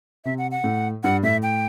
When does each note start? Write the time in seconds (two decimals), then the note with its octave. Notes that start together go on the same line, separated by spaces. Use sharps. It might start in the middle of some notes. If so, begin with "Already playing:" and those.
0.25 C3 E5
0.38 F#5
0.51 F#5
0.64 A2
1.03 G2 F#5
1.23 A2 E5
1.43 G5